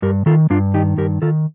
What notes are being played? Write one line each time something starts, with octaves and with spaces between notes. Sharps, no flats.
G2 G4 A#4
D#3 F4 A4
G2 D4 F4
D#3 D#4 G4
G2 G4 A#4
D#3 F4 A4